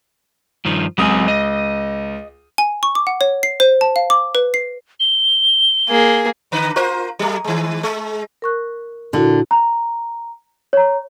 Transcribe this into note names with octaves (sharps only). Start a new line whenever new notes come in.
G2 D#3 F3
C#2 F#3 C4 G#5 D#6
D#5
G#5
C#6
D6
F#5
C#5
C7
C5
A5
F5
D6
B4
C7
G7
A#3 G#4
D3 B4
F4 A#4 C5
F#3 A3
D#3 G#3
G#3
A#4 C#6 F#6
A#2 D3 E4 F#4
A#5
C#5 A#5